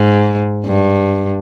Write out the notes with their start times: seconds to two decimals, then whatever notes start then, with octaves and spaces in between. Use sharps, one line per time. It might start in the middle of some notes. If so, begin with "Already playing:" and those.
Already playing: G#2
0.65 G2